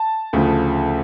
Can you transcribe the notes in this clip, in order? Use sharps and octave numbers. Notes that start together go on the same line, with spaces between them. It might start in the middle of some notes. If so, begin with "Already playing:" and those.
Already playing: A5
D2 C#3 F3 A3